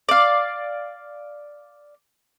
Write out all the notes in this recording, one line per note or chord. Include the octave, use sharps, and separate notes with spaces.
D5 F5